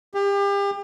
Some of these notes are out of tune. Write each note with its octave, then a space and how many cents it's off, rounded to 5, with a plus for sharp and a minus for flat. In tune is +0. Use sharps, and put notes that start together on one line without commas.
G4 +35